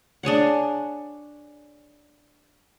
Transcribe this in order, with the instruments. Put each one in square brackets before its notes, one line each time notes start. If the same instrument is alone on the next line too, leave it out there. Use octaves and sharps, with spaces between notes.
[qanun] D4 G#4 C#5 F#5